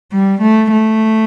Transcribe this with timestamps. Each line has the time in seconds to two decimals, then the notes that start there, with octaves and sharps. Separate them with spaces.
0.12 G3
0.42 A3
0.72 A3